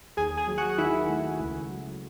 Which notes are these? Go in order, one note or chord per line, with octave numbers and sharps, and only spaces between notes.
D#2 G#4 G#5
G#4 G#5
F#3
F#4 F#5
D#3 E4 E5
A3
C#2
F#3